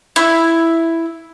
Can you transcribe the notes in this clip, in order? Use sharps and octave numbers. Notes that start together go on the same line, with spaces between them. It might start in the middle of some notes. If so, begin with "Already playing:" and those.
E4